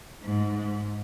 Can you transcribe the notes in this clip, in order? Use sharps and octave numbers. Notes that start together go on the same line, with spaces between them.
G#2